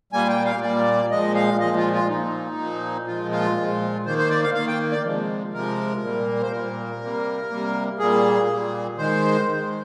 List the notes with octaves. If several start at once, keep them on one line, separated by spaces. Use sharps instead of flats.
A#2 G3 A#3 G#5
G5
F5
A#2 G3 A#3 D5
A#2 F3 G#3 D#5
F5
A#2 F3 G#3 D#5
F4
F4
A#2 F3 A#3 D#4
A#2 F3 A#3
A#2 F3 G#3 F4
F4
A#2 F3 G#3
D#3 A#3 C5
C5
D5
F5
D#3 A#3 F5
G5
D5
C3 F3 G#3
C3 F3 G#3 A#4
A#2 G3 A#3
C5
A#2 G3 A#3 A#4
C3 G3 A#3
C3 G3 A#3
A#2 G3 A#3 G#4
A#2 G3 A#3
D#3 G#3 C5
D#3 G#3